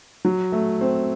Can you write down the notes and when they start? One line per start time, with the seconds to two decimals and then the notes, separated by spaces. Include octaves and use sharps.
0.25 F#3
0.52 A3
0.81 C4